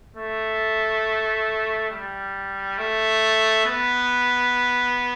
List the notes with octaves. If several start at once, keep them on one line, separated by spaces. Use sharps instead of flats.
A3
G3
A3
B3